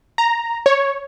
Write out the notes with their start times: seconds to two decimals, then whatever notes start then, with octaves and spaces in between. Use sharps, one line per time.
0.18 A#5
0.66 C#5